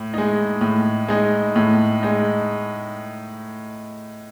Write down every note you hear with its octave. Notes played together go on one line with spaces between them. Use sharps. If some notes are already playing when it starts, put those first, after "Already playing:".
Already playing: A2
G#3 D#4
A2
G#3 D#4
A2
G#3 D#4